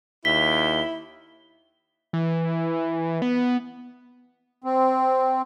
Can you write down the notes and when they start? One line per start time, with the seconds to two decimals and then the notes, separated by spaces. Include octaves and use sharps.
0.25 D#2 E4 B6 G7
2.13 E3
3.22 B3
4.64 C4